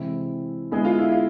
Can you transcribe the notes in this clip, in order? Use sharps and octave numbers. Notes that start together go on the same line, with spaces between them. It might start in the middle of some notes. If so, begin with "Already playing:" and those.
Already playing: C3 E3 G#3 C4 E4
D3 G#3 B3 E4 G#4
F4
E4
F4